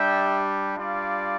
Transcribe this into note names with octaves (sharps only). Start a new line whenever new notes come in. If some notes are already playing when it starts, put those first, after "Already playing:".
Already playing: G3 D4 G4 E5 G5
G3 D4 F4 D5 F5